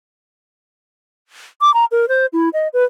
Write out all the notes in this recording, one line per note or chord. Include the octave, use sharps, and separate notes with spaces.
D6
A#5
A#4
C5
E4
D#5
B4